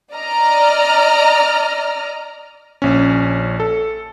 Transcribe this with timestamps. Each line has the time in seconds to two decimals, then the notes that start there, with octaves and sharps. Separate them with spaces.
0.13 D5 D#5 A#5 F6
2.82 A#1 C#4
3.60 A4